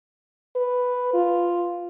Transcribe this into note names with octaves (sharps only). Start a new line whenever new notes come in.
B4
F4